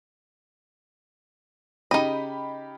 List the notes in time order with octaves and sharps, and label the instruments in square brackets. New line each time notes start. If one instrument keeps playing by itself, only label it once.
[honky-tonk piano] C#3 G4 B5 [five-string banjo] D#4 D#5